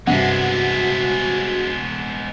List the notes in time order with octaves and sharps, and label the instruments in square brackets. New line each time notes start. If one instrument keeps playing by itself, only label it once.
[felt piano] G2 C3 [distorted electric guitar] G#3 B3 [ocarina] F#4 [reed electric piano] F#5